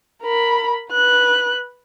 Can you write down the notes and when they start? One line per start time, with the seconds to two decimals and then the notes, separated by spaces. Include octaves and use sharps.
0.23 A#4 B5
0.92 B4 F#6